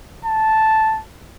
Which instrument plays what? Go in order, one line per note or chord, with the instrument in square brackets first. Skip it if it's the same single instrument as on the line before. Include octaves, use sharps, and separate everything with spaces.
[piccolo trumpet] A5